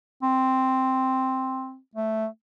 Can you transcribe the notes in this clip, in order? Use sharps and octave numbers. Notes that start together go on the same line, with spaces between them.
C4
A3